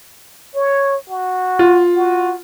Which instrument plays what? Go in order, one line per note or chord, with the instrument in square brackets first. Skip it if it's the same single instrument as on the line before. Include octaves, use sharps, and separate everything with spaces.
[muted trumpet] C#5
F#4
[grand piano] F4
[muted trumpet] F#4